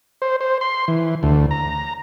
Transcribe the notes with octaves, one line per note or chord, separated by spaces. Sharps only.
C5
C5
C6
E3
D2
A#5